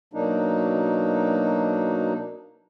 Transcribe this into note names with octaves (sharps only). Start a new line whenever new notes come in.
B2 F#3 A#3 D4 D#4